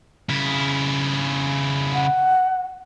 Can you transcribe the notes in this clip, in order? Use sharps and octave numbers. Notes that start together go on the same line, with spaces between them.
C#3 E4
F#5